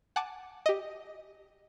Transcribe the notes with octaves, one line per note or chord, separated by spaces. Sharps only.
F#5 G#5 A5 D6
G4 D#5